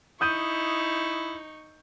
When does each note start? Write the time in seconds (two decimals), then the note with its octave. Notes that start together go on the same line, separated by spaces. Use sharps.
0.21 D#4 E4 C#6 D#6 G6 D#7